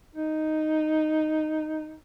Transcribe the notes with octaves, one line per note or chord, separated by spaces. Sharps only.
D#4